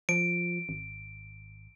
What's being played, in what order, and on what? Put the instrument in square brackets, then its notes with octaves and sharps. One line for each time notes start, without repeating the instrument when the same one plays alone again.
[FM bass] F3 [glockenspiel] D7
[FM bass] G#1